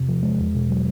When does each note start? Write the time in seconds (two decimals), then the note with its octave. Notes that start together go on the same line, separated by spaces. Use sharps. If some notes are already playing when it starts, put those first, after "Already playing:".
Already playing: E2 C3
0.09 F3
0.23 G#3
0.40 E2
0.55 B2
0.70 F#3